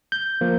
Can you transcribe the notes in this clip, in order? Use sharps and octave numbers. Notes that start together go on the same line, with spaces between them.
G6
F3 A#3